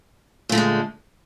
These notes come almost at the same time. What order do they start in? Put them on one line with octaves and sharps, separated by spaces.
A#2 A3 D3 G#3